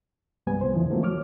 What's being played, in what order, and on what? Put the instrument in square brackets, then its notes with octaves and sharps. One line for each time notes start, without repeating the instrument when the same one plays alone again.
[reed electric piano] C2 G2 G3 B3 G#5
C2 C5
F2 A#2 D3 E3 F3
D#3 F3 F#3 A3 A#3 C4
C#5 D6 F6